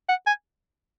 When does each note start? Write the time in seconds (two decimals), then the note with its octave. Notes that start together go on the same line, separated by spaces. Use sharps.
0.09 F#5
0.27 G#5